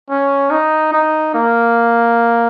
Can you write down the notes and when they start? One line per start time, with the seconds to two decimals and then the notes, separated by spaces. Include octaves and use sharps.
0.10 C#4
0.51 D#4
0.93 D#4
1.34 A#3